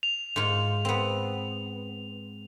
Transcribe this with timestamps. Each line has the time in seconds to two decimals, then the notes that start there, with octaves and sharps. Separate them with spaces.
0.03 F7
0.36 G#2 F4
0.85 B3 C4